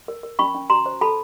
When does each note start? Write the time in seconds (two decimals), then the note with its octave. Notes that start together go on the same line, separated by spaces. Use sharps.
0.08 A#4
0.23 A#4
0.39 C#4 B5 C#6
0.55 C#4
0.70 F#4 A#5 C6
0.86 C5
1.01 A4 A5 B5